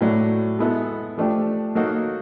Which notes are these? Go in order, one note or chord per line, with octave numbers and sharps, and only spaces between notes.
A2 F#3 A3 D4
G#3 B3 E4 A4
F3 A3 D4 G4
F#3 A#3 D#4 F#4 A4